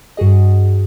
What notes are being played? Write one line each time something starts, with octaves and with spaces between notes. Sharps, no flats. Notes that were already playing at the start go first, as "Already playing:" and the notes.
G2 F#4 G#4 D#5